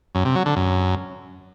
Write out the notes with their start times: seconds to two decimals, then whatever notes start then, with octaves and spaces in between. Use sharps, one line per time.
0.15 F#2
0.25 C3
0.36 F#3
0.46 D3
0.56 F#2